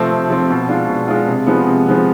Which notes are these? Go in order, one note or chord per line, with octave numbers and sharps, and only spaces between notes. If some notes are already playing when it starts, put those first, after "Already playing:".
Already playing: C3 F3 A3 C4
C3
F3 A3 C4
B2
G#3 D4 F4
B2
G#3 D4 F4
C3
F3 G#3 B3
C3
F3 G#3 B3